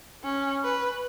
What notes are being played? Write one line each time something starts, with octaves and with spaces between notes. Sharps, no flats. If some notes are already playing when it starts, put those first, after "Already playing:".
C#4
B4